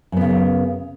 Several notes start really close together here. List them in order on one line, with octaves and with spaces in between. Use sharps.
F#2 B3 C#3